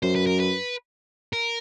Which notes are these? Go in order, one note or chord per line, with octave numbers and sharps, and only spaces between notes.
F#2 C5
B4
A#4
B4
A#4